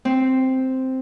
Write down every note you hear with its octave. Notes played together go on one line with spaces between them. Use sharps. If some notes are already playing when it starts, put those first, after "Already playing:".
C4